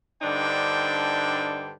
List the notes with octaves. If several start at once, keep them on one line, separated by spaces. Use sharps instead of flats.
G2 D3 D4 D#4 C5 G5